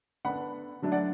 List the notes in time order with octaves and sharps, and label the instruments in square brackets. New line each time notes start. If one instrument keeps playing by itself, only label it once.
[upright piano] D3 B3 D4 F#5 B5
D3 F#3 A3 D4
D5 F#5